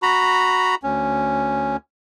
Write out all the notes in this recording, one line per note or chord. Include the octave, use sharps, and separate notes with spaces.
F#4 A#5 B5
D2 C#4